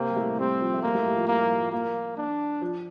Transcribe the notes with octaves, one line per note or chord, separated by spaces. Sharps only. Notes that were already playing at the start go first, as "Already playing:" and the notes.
Already playing: C3 A#3 C4
G3
A2 A3
G3 C4
F3
A3
G3 A#3
A2 A3
G3
F3
G3 A#3
A2 A3
G3
F3
F3 A#3
D4
F3